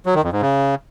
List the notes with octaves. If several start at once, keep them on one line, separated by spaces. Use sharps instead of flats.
F#3
D#3
F2
G#2
C#3